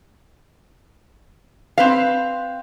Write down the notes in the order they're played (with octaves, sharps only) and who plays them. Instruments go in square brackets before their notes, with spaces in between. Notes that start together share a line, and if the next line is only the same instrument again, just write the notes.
[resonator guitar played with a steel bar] C4 B4 F5